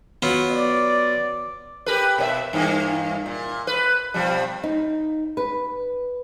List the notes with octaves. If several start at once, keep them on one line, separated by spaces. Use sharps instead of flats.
F#3 B3 F4
D5
G4 A#4 B4
B2 C#5 E5
G2 E3 A#3
A#2
B4
B2 F3 G3
D#4
B4